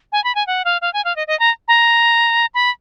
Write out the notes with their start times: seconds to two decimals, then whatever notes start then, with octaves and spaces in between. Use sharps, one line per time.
0.12 G#5
0.24 B5
0.35 G#5
0.47 F#5
0.65 F5
0.81 F5
0.93 G#5
1.05 F5
1.16 D#5
1.27 D#5
1.39 A#5
1.68 A#5
2.54 B5